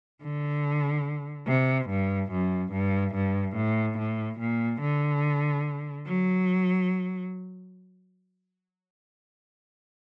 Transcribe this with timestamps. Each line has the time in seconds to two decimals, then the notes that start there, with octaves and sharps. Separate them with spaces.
0.23 D3
1.47 C3
1.89 G2
2.31 F#2
2.72 G2
3.14 G2
3.56 A2
3.98 A2
4.39 A#2
4.81 D3
6.06 F#3